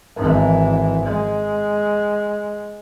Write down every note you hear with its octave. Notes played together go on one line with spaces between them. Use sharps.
G#1 E3
G#3